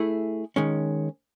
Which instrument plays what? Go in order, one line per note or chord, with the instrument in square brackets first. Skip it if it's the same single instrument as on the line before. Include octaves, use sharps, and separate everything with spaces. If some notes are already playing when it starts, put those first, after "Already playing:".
Already playing: [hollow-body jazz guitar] A3 E4 G#4
D#3 G#3 C#4